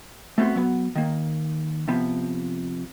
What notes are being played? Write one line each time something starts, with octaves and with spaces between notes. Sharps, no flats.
A3 B3 C4 F#4 C6
F#3 B3
D#3 A#3
C3 F3 B3